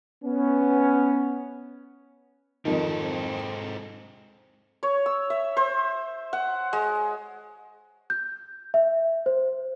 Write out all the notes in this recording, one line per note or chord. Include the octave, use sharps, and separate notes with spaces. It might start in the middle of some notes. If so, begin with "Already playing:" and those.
B3 C#4
F2 G#2 D#3 A4
C4
C#5
E6
E5
C5
F#5
G#3
G6
E5
C5